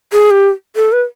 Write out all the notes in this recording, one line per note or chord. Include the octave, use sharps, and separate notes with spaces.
G#4
G4
A4
B4